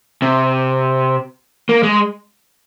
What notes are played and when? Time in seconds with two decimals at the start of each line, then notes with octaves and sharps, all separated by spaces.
0.22 C3
1.69 A#3
1.83 G#3